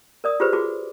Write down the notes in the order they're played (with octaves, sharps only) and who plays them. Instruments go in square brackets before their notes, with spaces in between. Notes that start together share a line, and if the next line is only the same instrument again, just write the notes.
[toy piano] A#4 D5 D#6
F4 G4 G#4 B4 C5 B5
F4 F#4 G#4 D6